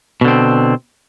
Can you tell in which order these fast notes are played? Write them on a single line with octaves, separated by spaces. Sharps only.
B2 D3 C4